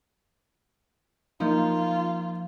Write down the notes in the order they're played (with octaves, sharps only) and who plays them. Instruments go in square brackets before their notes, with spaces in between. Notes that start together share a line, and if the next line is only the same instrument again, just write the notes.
[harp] F3 [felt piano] A#3 D#4 [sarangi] F4